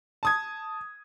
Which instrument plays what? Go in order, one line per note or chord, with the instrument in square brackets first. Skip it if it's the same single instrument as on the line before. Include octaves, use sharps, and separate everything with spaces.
[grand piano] A5 D#6 G#6